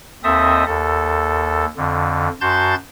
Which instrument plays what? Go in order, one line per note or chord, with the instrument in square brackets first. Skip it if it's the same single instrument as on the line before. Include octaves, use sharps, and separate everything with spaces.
[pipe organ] D#2 C4 A4 D#5 E5 D#6
D#2 A4
F2 D3
F#2 F#4 A5 C6 G6 A6